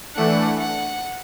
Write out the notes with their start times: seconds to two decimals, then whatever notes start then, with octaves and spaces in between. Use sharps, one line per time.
0.15 E3 A3 D4 F#5
0.60 F#5